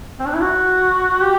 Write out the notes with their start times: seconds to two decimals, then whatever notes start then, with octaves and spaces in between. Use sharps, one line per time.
0.19 C4
0.27 D4
0.34 E4
0.41 F#4
1.21 G4